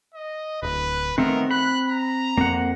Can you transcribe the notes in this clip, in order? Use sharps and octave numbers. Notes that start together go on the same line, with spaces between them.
D#5
D1 B4
D#3 A3 B3 C4 A#4
B5 F#6
A#5
F2 A#3 C4 F#5